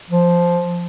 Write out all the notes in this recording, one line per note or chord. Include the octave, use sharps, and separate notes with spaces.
F3